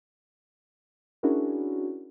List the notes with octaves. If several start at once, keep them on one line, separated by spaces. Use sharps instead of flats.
C#4 D4 E4 F#4 G#4 A#4